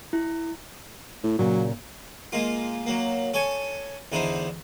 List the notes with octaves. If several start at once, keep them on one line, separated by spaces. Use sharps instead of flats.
E4
A2
A#2 C#3 F#3
G#3 A#3 F4
F#3 A#3
A4 C#5 G#5
E2 D3 D#4 E4 C5